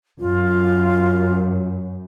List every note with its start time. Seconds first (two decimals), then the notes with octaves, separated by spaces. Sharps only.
0.20 F#2 F4